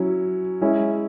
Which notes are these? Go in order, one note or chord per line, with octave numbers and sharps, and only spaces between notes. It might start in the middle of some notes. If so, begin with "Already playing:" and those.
Already playing: F#3 C#4 E4
G#3 C#4 E4